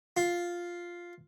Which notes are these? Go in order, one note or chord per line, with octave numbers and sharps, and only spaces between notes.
F4